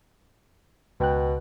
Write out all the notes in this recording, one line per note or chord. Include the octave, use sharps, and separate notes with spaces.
C#2 B2 G5 F#6